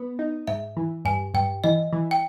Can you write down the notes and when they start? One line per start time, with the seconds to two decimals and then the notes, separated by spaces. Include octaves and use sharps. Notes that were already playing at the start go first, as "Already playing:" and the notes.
Already playing: B3
0.19 D#4
0.47 G#2 E5
0.77 E3
1.05 G2 G#5
1.34 G2 G5
1.64 E3 D#5
1.93 E3
2.11 G5